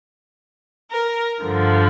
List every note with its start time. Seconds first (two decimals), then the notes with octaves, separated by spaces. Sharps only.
0.89 A#4
1.43 G2 D3 F3